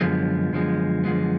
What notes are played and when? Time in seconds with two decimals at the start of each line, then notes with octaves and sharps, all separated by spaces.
0.01 F#2 D3 F3 G#3 B3
0.52 F#2 D3 F3 G#3 B3
1.03 F#2 D3 F3 G#3 B3